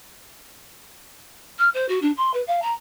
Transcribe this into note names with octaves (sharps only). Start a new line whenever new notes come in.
F6
C5
F#4
D4
C6
B4
F5
A#5